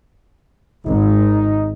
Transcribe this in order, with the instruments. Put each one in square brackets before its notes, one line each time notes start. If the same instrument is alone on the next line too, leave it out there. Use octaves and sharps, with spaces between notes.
[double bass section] G#1 [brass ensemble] D#4